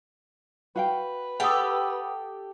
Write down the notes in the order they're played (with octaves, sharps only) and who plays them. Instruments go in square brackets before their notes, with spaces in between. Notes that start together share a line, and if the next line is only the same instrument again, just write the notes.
[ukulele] F#4 F5 G5 [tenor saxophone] B4
[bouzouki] G4 A4 [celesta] F#5 D#6